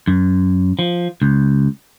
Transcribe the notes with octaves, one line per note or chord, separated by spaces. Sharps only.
F#2
F3
C#2